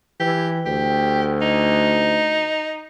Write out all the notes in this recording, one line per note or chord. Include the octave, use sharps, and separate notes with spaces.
E3 G4
D2 G4
D#4